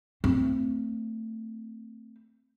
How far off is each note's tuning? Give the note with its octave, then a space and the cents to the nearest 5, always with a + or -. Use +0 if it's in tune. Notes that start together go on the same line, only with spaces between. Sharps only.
A3 +25 C4 +0